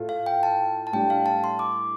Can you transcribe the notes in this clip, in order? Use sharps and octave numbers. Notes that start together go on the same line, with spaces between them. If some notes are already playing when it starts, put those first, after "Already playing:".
Already playing: A2 A3 F4
F5
G5
A5
A5
A2 G3 D4 G5
F5
A5
C6
D6